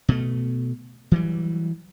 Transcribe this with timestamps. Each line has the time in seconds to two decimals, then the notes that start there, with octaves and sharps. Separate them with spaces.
0.09 B2 A3
1.12 E3 F#3 G3